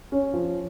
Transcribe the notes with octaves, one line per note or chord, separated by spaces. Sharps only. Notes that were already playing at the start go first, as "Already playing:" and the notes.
C#4
F3